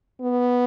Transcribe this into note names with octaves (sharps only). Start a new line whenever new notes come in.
B3